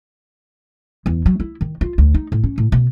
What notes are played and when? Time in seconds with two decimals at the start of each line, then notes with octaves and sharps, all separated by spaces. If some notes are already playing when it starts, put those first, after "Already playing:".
1.06 E2
1.26 F#3
1.40 E4
1.61 D#3
1.81 F4
1.98 D2
2.14 D#4
2.32 A2
2.44 C#4
2.58 A2
2.72 B2